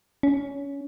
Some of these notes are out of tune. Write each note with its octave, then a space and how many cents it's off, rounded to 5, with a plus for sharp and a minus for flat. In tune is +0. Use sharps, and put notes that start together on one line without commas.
C#4 +20